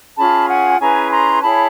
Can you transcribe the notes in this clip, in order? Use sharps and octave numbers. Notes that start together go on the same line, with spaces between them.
C#4 F4 G#4 A5 B5
F#5 G#5
C#4 E4 G#4 B4 G#5 A#5
A#5 C6
E4 G#4 C#5 A5 B5